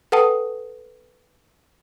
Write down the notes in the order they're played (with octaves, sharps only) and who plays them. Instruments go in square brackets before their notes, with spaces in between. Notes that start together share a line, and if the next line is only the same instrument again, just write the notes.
[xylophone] A4 B4 F#5 G5 A5 D#6